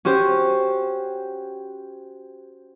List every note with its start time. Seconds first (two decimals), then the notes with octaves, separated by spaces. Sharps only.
0.05 C#4 F#4 G4 C5